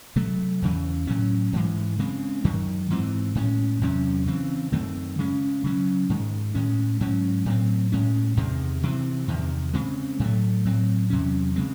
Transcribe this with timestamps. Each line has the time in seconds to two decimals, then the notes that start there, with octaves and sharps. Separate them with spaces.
0.16 C3 F#3 A3
0.62 E2 C#3 E3
1.07 A2 F#3 C#4
1.53 G#2 E3 G#3
1.99 C#3 G#3 C4
2.45 F#2 D#3 F#3
2.90 G#2 E3 C4
3.35 A2 G#3 C#4
3.81 E2 C3 F#3 C#4
4.26 C#3 E3 C4
4.72 F#2 D#3 A3 C4
5.19 C#3 G#3 C#4
5.64 C#3 F#3 C#4
6.09 G#2 D#3 G#3
6.55 A2 G#3 C#4
7.01 G#2 F#3 C#4
7.46 A2 F#3 C4
7.92 A2 G#3 C#4
8.37 E2 C3 D#3 G#3
8.83 C3 E3 C4
9.28 E2 C3 D#3
9.74 C#3 G#3 C4
10.19 A2 F#3 A3
10.65 A2 F#3 C4
11.10 E2 C3 F#3 C#4
11.56 C#3 G#3 C4